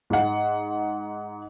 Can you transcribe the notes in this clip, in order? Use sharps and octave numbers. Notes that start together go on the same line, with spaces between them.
G#2 F#5